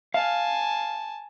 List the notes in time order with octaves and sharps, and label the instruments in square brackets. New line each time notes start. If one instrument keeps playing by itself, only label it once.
[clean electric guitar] F5 [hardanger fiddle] G#5 A5